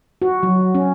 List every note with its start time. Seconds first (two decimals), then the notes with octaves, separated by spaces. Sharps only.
0.22 F#4
0.43 F#3
0.75 C#4